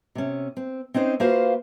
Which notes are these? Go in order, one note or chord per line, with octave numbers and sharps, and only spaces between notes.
C3 C#4
C4
C4 C#4 D#4 C5
A#3 F4 F#4 B4 C5 F5